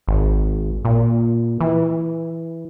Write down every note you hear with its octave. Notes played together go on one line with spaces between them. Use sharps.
G#1
A#2
E3